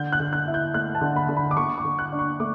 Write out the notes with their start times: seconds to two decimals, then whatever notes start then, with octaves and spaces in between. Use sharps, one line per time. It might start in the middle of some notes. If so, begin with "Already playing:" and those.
Already playing: D3 G6
0.12 F#6
0.20 D3
0.33 F#6
0.47 E4
0.54 G6
0.74 A3 F#6
0.95 A5
1.01 D3
1.16 B5
1.29 D3
1.37 B5
1.51 D6
1.57 D3 C#6
1.78 D6
1.85 D3
1.99 F#6
2.12 D4
2.19 C#6
2.40 A3 D6